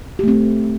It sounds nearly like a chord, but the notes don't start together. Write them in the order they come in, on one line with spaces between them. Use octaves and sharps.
G4 A3 C4